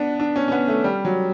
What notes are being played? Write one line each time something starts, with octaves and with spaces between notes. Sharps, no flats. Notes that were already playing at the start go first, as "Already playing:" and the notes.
Already playing: B3 D4
D4
C#4
C#4
B3
A3
G3
F#3